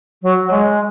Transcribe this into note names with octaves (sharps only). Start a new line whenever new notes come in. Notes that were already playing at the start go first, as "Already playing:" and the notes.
F#3
G#3